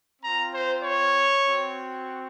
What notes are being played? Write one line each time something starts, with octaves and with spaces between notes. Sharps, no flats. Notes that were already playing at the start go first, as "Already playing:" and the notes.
C4 F4 A#5
C5
C#5
C4 F#4